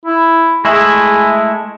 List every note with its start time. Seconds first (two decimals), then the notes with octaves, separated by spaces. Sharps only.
0.05 E4
0.65 G#3 A3 E4 G#4